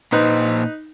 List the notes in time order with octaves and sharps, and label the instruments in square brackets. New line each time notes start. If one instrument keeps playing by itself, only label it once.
[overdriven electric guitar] A#2 C5 [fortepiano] D#4 B4